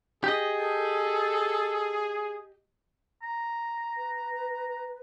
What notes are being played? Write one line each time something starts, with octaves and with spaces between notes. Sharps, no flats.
G4 G#4 D#5
A4
A#5
B4